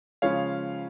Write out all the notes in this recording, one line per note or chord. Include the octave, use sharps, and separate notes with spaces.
C#3 F3 G#3 C#5 F5